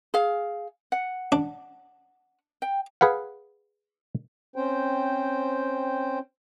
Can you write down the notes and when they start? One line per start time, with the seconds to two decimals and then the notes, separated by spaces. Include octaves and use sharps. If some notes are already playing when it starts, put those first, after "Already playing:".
0.14 G#4 F5
0.92 F#5
1.32 D4
2.62 G5
3.01 G#4 B4 F5 F#5
4.56 C4 C#4 C5 G5